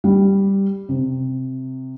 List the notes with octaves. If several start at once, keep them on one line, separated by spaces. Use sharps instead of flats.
G3
C3